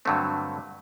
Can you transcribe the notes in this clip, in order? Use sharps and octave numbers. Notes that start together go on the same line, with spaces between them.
G2 D3 F#3 A3 C4